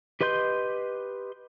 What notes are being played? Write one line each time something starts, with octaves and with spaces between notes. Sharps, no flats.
G4 B4 D#5 C6 G6